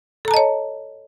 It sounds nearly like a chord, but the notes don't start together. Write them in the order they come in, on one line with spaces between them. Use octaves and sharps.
A4 A#5 A5 D#5 C#5